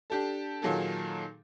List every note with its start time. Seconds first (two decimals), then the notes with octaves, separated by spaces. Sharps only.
0.10 D4 G4 A4
0.62 A#2 D#3 F#3 A#3 G#4 A4